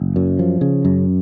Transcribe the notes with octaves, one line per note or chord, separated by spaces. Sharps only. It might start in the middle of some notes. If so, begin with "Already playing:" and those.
Already playing: F#1
F#2
F3
C#3
F#2